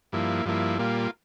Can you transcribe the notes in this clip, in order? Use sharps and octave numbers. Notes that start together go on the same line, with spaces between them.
G2 F3 A#3 E4
G2 F3 A#3 E4
A#2 G3 A#3 F4